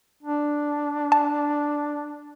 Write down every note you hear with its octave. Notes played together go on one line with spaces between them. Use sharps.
D4
A5